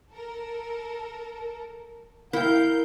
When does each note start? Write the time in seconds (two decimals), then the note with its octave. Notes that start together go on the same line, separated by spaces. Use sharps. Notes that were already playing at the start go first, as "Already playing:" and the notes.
0.12 A4 A#4
2.33 E4 A#4 F5 G5 G6